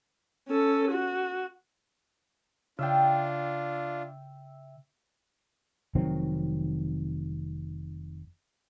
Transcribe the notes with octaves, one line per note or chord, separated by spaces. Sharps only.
C#4 A4
F#4
C#3 D4 F4 E5 G5
F1 D#3 F#3 C4